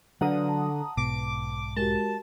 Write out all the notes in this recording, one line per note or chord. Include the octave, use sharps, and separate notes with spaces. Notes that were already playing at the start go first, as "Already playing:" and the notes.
D3 F#3 B4 F5 F#5 A#5 D#6 F6
A5
B1 G#2 B2 D6
G#3 F#4 G4 A#4 A5